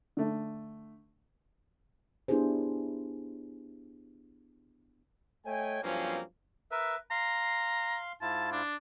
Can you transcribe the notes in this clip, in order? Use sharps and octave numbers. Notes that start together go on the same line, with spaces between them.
D3 A3
B3 D4 E4 G4 G#4 C5
A3 C#5 D#5 G5 G#5
G2 F3 F#3 A#3 C4 C#4
A#4 B4 E5
F5 A#5 C6
G#2 E4 F4 A5
D4